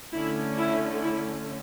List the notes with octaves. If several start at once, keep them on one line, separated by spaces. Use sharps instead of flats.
D3 A3 C#4 E4
E4
E4